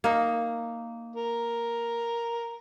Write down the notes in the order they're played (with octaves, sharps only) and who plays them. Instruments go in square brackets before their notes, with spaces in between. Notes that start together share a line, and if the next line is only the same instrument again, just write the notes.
[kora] A#3 D#4
[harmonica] A#4